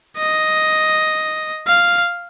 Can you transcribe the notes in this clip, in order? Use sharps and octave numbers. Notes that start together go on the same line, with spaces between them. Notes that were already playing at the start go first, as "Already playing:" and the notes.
D#5
F5